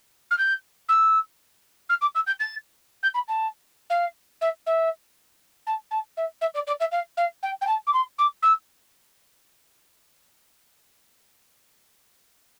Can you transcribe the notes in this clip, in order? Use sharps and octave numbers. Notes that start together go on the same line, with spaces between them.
F6
G6
E6
F6
D6
E6
G6
A6
G6
B5
A5
F5
E5
E5
A5
A5
E5
E5
D5
D5
E5
F5
F5
G5
G5
A5
D6
C6
D6
E6